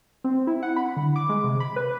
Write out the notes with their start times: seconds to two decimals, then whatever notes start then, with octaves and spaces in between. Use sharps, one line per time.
0.24 C4
0.47 E4
0.63 F#5
0.76 B5
0.97 D3
1.16 D6
1.29 G#3
1.44 C3
1.60 B5
1.76 B4